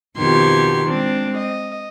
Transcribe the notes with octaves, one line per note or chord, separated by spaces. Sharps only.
F2 B2 D#3 G4 C6 G#6
G#3 C4 D4
D#5